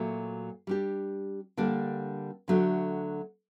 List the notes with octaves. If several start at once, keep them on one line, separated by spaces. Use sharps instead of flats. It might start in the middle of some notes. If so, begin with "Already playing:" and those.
Already playing: A#2 F#3 A3
G3 D4 G4
D3 G3 A#3 D4
D3 F#3 A3 D4